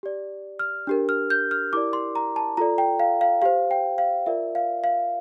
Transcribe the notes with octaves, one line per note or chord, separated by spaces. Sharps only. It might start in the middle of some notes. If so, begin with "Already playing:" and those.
G4 D5
F6
D4 G4 A#4
F6
G6
F6
E4 G4 A#4 D5 D6
C6
A#5
A5
F4 A4 D5 A#5
G5
F5
F5
G4 C5 F5
G5
F5
F4 A#4 D5 E5
F5
F5